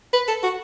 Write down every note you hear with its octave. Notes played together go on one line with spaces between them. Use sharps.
B4
A4
F#4